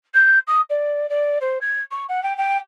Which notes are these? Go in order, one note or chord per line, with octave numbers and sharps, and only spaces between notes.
G6
D#6
D5
D5
C5
G#6
C#6
F#5
G5
G5